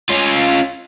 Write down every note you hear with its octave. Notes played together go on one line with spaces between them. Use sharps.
C#4 F4